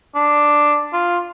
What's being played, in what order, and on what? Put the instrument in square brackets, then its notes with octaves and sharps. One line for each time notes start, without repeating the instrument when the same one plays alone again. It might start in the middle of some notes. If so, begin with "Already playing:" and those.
[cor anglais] D4
F4